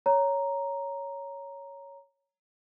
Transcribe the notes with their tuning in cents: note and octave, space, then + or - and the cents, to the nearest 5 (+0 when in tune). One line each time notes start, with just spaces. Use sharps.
C#5 +5 A#5 +0